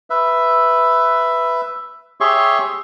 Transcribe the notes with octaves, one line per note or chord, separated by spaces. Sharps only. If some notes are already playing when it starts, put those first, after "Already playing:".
B4 E5
G4 G#4 C#5 E5 C6 C#6